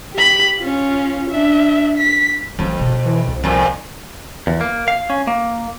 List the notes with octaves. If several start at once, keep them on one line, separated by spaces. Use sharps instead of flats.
G4 B5
C#4 F4
D4 E5
B6
A1 F2 E3 F#3
F#1 B2
E3
C2
F2 A#2 F3
E2
A#3
F5
C#4
A#3